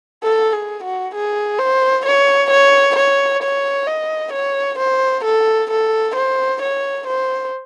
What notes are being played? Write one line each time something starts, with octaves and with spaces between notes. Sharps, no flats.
A4
G#4
F#4
G#4
C5
C#5
C#5
C#5
C#5
D#5
C#5
C5
A4
A4
C5
C#5
C5